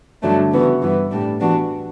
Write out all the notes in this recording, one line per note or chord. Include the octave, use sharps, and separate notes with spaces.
G2 D3 F#3 A3 D4
C#3 E3 B3 F#4
G2 E3 B3
A2 G3 D4
E3 B3 D4 F#4